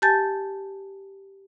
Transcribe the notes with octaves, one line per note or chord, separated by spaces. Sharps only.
G4 G#5 A5 G6 A6